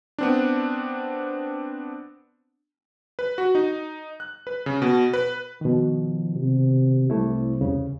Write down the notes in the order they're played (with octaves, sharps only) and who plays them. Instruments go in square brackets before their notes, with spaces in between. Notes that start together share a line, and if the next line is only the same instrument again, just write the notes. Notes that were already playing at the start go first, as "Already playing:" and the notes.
[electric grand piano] B3 C4 D4
B4
F#4
D#4
F#6
B4
C#3
B2
B4
[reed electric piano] B2 D#3 [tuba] F3
[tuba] C3
[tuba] C2 [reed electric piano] G3 A3 E4
[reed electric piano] E2 C#3